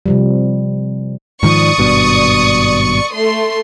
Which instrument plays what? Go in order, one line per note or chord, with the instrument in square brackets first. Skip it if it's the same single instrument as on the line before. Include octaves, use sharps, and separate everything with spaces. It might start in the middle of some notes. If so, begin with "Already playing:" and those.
[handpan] C3 F3 G3
[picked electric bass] G#2 D#3 F3 [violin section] D5 C#6 D#6
[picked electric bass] G#1 G2 B2
[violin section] A3 C6